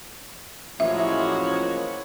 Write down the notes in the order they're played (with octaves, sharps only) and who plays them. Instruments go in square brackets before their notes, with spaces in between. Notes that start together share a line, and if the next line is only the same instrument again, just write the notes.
[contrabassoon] A1 [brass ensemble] F3 G#3 A#3 [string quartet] E4 F#4 C#5 [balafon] E5